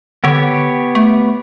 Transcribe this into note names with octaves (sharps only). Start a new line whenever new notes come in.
D3 B3 G4 C#5
A3